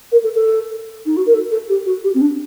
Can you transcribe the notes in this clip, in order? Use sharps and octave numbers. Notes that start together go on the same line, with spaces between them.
A#4
A4
A4
D#4
F#4
A#4
A4
A4
G4
F#4
G4
C4
D4